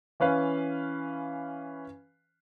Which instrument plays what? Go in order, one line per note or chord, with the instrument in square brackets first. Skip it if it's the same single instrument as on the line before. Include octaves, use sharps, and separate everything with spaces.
[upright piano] E3 C#4 B4 F5